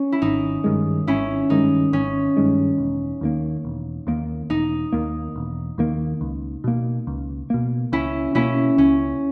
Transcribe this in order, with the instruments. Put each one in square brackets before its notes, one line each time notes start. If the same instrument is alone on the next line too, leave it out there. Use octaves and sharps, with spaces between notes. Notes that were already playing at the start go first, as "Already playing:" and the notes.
Already playing: [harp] C#4
E4
[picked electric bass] G#1 [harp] D#4
[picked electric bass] G2 D#3 G#3
[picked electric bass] G#1 [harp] C#4 E4
[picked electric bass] G2 D#3 G#3 [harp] D#4
[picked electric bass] G#1 [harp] C#4
[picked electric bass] G2 D#3 G#3
E1
D#2 D#3 A#3
E1
D#2 D#3 A#3
[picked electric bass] E1 [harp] D#4
[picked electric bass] D#2 D#3 A#3
E1
D#2 D#3 A#3
C#2
B2 A#3
C#2
B2 A#3
[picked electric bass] C#2 [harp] C#4 E4
[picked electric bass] B2 A#3 [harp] C#4 E4
[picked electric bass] C#2 [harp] C#4